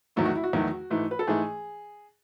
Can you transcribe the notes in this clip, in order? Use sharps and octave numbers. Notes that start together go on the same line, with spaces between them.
E2 D#3 F#3 A3 E4
F#4
E4
F#4
E2 D#3 F#3 A3
G#2 E3 A3
B4
A4
G#2 E3 A3 G#4